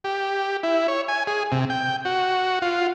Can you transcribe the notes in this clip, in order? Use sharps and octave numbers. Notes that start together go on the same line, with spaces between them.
G4
E4
C#5
G#5
G#4
C3
G5
F#4
F4